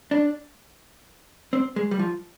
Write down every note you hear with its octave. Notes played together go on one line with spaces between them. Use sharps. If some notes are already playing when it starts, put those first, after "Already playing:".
D4
C4
G#3
G3
F3